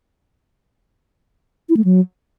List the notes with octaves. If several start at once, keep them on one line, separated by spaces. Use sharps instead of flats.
E4
A3
F#3